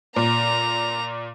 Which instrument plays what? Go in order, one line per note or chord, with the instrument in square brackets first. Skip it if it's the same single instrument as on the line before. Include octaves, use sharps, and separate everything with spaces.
[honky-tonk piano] A#2 [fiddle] A#5